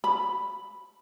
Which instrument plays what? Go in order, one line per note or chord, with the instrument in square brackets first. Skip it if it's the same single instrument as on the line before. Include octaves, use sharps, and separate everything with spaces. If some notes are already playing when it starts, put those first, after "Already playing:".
[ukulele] B5